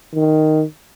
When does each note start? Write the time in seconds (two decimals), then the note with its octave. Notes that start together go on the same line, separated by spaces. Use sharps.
0.14 D#3